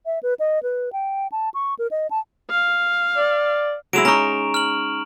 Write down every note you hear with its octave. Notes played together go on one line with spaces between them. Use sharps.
E5
B4
D#5
B4
G5
A5
C#6
A#4
D#5
A5
F5
D5
F#3 G#3 E4 D7 E7 F7
C#4 D#4 A#5 C#6
F6 F#7